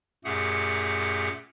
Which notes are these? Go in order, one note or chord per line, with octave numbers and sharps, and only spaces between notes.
F#2 A#2 A3 G4 G#4 F#5